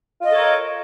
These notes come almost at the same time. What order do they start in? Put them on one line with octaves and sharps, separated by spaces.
F4 D#5 A4 C#5 A#4